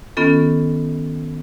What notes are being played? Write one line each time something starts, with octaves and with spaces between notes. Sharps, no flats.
D#3 B3 C#4 F4 A4